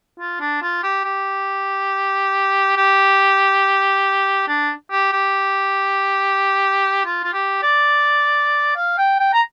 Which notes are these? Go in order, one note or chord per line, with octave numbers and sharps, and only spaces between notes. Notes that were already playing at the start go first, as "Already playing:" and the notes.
F4
D4
F4
G4
G4
G4
D4
G4
G4
F4
F4
G4
D5
F5
G5
G5
A#5